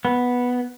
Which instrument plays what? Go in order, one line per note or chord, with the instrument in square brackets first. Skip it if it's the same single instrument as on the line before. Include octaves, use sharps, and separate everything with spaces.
[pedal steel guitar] B3